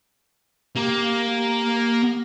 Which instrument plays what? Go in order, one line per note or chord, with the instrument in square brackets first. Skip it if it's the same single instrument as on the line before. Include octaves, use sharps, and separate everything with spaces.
[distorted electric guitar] A#3 [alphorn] G4
[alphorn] G4